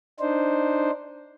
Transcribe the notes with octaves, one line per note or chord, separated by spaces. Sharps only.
D4 D#4 C5